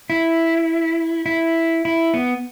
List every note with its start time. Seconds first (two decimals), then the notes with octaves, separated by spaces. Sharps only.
0.10 E4
1.26 E4
1.85 E4
2.14 B3